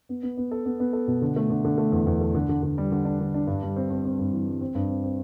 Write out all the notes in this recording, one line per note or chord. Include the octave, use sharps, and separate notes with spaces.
B3
B3
B3
A4
B3
B3
A4
B2
D3
A3
D3
D3
A3
E2
E2
A3
D3
D3
D3
G3
D3
D4
D3
D4
G2
G3
C4
C4
C4
G2
E3
G3
C4
G2
C4
C4